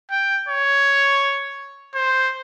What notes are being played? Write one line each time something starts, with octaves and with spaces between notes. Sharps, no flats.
G5
C#5
C5